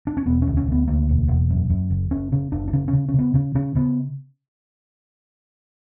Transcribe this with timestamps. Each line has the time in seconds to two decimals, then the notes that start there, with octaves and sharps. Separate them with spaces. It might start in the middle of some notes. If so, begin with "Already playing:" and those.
0.07 D4
0.17 C#4
0.26 E1 B3
0.42 D2 C#4
0.57 C#4
0.67 D2 B3
0.88 D2 A#3
1.09 E1
1.28 E1
1.50 F#2
1.70 F#2
1.90 F#1
2.11 F#1 C#4
2.32 C#3 C#4
2.52 F#1 D4
2.68 D4
2.73 C#3 C#4
2.88 C#4
2.93 C#3
3.08 C#4
3.14 C#3 B3
3.34 C#3 C#4
3.55 C#3 C#4
3.75 C#3 B3